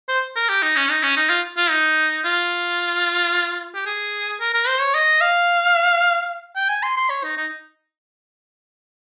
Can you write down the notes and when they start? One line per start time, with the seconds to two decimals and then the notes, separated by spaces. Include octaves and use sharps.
0.08 C5
0.36 A#4
0.49 G4
0.62 D#4
0.76 C#4
0.90 D#4
1.03 C#4
1.16 D#4
1.30 F4
1.57 F4
1.70 D#4
2.25 F4
3.75 G4
3.86 G#4
4.40 A#4
4.54 A#4
4.68 C5
4.81 C#5
4.95 D#5
5.21 F5
6.55 G5
6.69 G#5
6.83 C6
6.97 C6
7.10 C#5
7.23 D#4
7.37 D#4